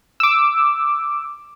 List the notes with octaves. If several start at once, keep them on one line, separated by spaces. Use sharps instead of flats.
D6 E6